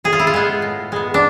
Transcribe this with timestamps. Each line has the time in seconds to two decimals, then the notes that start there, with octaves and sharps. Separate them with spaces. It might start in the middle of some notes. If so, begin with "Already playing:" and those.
0.04 A2 G#4
0.13 F4
0.19 E4
0.27 F4
0.34 G#3 B3
0.62 A2
0.92 G#3 B3
1.14 D4